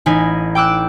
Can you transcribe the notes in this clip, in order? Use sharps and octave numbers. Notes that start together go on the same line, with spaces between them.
A1 D#4 G#5 B5
G5 D6 E6 F#6